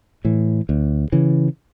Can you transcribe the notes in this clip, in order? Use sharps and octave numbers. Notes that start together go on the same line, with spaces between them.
A2 E3
D2
C#3 E3